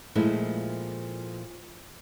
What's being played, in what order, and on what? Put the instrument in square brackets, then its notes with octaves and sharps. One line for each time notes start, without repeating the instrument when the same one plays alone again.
[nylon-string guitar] A#2 F3 G#3 A3 E4